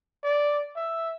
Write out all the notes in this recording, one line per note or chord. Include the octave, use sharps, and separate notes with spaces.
D5
E5